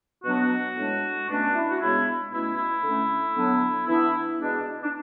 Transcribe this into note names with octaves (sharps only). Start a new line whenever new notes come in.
B2 F#3 B3 D4 F#4
A2 G#3 D4
B2 A3 C#4 D4
E4
F#4
C#3 G#3 B3 D4 E4
B2 A3 C#4 E4
E4
D3 A3 C#4
D3 F#3 B3 D4
E3 B3 D4 E4
B2 G#3 B3 D4
D4